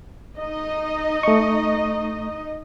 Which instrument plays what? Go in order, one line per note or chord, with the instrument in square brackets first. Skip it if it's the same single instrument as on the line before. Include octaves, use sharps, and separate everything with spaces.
[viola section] D#4 D#5
[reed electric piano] A3 C#6